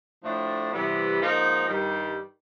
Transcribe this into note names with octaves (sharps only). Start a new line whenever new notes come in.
A2 F3 A3 D4
C3 E3 G3 B3
G#2 F3 A#3 D#4
G2 D#3 G3